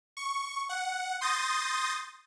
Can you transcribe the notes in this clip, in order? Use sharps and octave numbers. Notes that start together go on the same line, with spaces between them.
C#6
F#5
C6 D#6 G6 A6 A#6